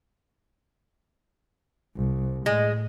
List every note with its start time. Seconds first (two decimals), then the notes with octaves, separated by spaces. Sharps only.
1.96 C2
2.46 A2 G#3